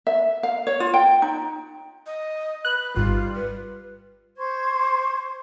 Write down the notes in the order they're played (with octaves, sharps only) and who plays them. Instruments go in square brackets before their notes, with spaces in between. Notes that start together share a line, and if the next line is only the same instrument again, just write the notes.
[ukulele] E5
F5
C#5
F4
G5
D#4
[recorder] D#5
[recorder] B4 [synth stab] F#6
[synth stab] G#1 [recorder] G3 [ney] F4
[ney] B4
[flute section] C5 C#6 G#6